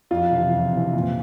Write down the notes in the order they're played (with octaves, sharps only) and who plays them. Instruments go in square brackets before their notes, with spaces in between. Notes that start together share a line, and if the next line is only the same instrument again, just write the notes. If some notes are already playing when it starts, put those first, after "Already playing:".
[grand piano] F2 F4
C3 E3
F2
C3 E3
A#2